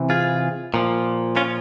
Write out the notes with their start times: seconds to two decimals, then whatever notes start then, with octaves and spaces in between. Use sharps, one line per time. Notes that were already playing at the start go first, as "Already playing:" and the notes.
Already playing: C3 E3
0.10 F4 G#4
0.74 A#2 F3
1.36 C#4 F4